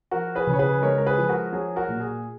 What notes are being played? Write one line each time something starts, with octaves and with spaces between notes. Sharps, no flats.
F3 F#4 A#4
G#4 B4
C#3
C#5
G#4 B4
G#3 A#4 C#5
A#4
G#4 B4
F3
F#4 A#4
F#3 G#4
F#4 A#4
A#2
G#4